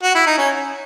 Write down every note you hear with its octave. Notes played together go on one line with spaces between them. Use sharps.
F#4
E4
D#4
C#4